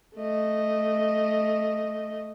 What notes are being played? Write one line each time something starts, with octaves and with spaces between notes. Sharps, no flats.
A3 D#5